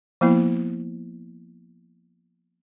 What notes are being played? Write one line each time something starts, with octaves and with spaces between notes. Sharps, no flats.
F3 A#3 B3 E4